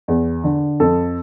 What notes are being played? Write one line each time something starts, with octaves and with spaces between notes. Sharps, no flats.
E2
D3
F2 A4